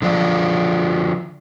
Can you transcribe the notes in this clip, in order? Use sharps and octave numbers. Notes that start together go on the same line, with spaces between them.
D3 F3 F4 D5